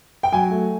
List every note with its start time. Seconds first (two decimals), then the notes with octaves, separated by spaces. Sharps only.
0.23 G5
0.32 F#3 G#5
0.50 A3